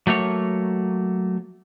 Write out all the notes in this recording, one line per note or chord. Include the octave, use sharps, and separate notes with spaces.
F#3 A3 A#3 C#5